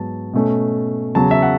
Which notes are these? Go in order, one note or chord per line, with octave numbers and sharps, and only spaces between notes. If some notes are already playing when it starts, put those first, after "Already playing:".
Already playing: G#2 F#3 B3 A5
B2 A3 C#4
E2 C#3 F#3 A5
E5
F#5